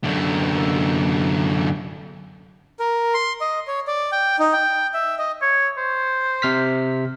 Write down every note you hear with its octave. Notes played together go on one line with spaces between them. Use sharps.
F#2 D3
A#4
C6
D#5
C#5
D5
G5
D#4
G5
E5
D#5
C#5
C5
C3 F6 B6